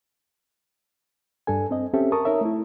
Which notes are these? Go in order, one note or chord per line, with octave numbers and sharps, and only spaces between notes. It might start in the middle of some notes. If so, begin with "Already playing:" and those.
G2 D4 A4 G#5
C4 D#5
C4 C#4 G4 A4 E5
A#4 A5 C#6 D#6
D#4 A#4 C#5 E5
A3 E4